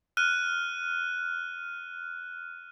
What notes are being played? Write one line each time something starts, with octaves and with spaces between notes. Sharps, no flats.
F6 F#6 D#7